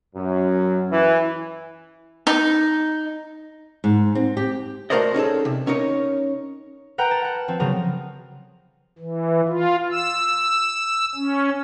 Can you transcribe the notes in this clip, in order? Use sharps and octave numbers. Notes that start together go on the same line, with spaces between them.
F#2
E3
D#4
G#2
C4
G4
A3 F#4 A#4 C5 D5 D#5
C#4 D#4 G#4 A4
C3
C#4 D#4 A#4 C#5
A#4 B4 F#5 G5 A#5 F#6
A5
F#5
F3 C4
C#3 F#3 B3 A#4
E3
F4
E6
C#4